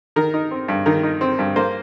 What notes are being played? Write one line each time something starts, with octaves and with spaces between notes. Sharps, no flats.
D#3 A#4
D#4
C4
G2
D#3 A#4
D#4
C4
G2
A#3 C5